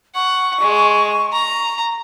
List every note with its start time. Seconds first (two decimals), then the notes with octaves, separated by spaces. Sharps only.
0.15 F#5 C#6
0.61 G#3
1.33 A#5